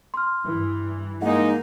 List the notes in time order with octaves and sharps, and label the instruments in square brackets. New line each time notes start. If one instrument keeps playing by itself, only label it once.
[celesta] C6 F6
[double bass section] G2 E3
[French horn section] G#3 D#4 [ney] A#3 [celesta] F#5